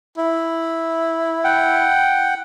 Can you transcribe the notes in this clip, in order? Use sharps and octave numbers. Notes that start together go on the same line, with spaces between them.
E4
F#5 G5